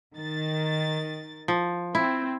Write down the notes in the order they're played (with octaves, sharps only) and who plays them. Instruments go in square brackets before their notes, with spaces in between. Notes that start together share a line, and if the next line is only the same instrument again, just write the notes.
[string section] D#3 A6
[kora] F3
[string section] C4 [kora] E4